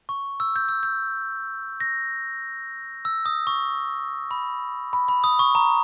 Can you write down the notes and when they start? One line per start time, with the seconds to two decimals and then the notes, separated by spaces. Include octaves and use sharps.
0.09 C#6
0.40 E6
0.56 G6
0.69 E6
0.83 G6
1.80 A#6
3.05 E6
3.26 D#6
3.47 C#6
4.31 B5
4.93 B5
5.08 B5
5.24 D#6
5.39 C#6
5.55 A#5